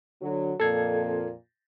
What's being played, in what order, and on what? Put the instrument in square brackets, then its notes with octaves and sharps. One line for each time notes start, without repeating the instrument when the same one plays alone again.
[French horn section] D3 F#3
[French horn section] F2 A#2 [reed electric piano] A4 G#6